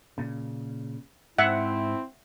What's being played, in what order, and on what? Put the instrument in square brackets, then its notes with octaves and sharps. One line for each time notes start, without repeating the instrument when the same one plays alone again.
[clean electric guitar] A#2 C#3
[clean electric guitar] G#2 [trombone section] C4 E4 [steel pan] E5 F#5